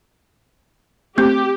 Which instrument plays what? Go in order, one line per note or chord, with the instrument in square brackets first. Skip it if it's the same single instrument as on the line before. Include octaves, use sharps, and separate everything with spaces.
[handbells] A3 C4 G6 [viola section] G4